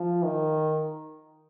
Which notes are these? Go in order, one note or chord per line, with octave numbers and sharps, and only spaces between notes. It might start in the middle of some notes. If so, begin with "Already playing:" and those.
Already playing: F3
D#3